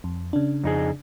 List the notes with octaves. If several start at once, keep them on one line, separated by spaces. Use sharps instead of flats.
F2
C#3 D4
F2 D#4 G#4